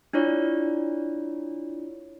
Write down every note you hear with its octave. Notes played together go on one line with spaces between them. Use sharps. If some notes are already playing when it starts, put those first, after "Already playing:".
D4 E4 F4 C#5 D5